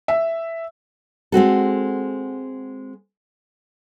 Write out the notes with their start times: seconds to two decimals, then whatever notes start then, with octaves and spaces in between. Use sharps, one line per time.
0.08 E5
1.32 G#3 C4 F#4 A4